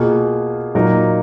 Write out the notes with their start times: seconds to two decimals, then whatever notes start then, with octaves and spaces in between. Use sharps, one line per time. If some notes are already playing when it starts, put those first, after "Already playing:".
Already playing: B2 A#3 F4 G#4
0.75 A#2 F#3 A#3 D#4 A#4